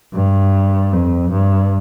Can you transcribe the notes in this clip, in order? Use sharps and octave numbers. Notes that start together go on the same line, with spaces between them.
G2
F2
G2